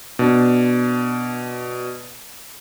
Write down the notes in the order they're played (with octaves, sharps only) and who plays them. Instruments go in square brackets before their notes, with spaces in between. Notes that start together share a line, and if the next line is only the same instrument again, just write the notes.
[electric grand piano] B2 D4